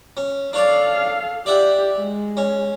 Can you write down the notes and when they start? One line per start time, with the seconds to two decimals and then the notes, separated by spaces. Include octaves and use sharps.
0.17 C#4
0.53 D4 A4 C#5 D5 F5
1.46 G4 D5 E5 F#5
1.98 G#3
2.37 C#4